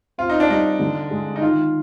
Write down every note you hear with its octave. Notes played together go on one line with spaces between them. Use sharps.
C4 F4
D#4
D4
G3 D#4
D3
G#3
D#4
D#3 F4